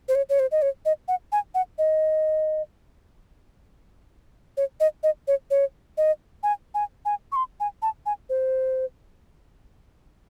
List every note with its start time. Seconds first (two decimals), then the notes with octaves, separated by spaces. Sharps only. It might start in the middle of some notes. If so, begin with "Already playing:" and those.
0.08 C5
0.15 C#5
0.29 C#5
0.39 C5
0.52 D#5
0.62 C#5
0.85 D#5
1.08 F#5
1.32 G#5
1.55 F#5
1.78 D#5
4.57 C#5
4.80 D#5
5.03 D#5
5.28 C#5
5.51 C#5
5.97 D#5
6.43 G#5
6.74 G#5
7.05 G#5
7.32 C#6
7.36 C6
7.60 G#5
7.82 A5
8.06 G#5
8.29 C5